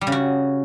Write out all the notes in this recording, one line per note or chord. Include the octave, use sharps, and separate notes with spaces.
G3
C#3
F#4